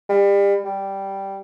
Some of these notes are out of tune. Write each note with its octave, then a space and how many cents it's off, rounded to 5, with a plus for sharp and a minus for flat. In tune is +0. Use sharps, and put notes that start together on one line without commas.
G3 +30
G3 -5